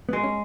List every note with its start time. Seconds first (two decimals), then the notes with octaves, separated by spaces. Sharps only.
0.09 B3
0.13 G#3
0.23 C#4